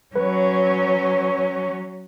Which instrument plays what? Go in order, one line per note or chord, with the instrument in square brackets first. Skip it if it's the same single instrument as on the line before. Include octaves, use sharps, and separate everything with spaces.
[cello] F#3 C#4 [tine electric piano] B4